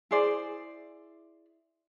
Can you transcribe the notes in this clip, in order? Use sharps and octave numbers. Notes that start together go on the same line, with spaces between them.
E4 G#4 C5 D5